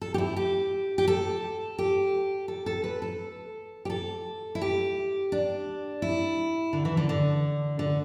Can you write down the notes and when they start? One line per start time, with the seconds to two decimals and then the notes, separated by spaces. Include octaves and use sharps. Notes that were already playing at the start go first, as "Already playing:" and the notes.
0.01 A4
0.14 G4
0.18 E4
0.36 G4
0.98 G4
1.08 A4
1.78 G4
2.48 A4
2.66 A4
2.84 B4
3.02 A4
3.85 G4
3.90 A4
4.55 E4
4.62 G4
5.32 D4
6.02 E4
6.73 D3
6.85 E3
6.97 D3
7.09 D3
7.79 D3